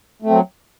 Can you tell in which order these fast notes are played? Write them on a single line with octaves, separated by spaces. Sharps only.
A3 C4 F#3